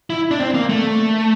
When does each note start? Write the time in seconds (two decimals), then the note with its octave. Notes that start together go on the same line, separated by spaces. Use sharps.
0.10 E4
0.31 D4
0.40 C4
0.54 A#3
0.69 A3